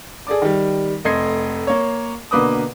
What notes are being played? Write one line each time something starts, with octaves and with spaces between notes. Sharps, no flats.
G#4 A4 D5 D6
D#3 G3
F1 A3 D#5 C6 G#6 C7
A#3 C#5
B2 D3 A#3 B4 D6 D#6